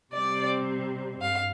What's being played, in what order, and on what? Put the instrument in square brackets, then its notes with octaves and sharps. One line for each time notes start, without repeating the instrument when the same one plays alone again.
[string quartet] C3 G3 C4 D5
G2 F5